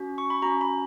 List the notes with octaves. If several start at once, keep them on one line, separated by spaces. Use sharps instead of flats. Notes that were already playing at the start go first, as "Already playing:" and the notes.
Already playing: C#4 F#4
C#6
B5
C#4 F#4 A#5
B5